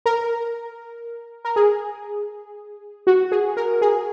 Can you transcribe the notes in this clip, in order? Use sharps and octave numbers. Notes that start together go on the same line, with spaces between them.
A#4
A#4
G#4
F#4
G#4
A#4
G#4